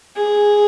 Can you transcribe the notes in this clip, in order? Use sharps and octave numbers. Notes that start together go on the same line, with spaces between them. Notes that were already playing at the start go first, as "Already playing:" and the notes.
G#4